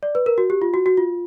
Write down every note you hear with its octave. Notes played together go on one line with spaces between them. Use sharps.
D5
B4
A#4
F#4
G4
F4
F#4
F#4
F4